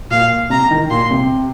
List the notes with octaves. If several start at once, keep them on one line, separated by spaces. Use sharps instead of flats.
A#2 F5
C3 A#5
D#3
A#2 C6
C3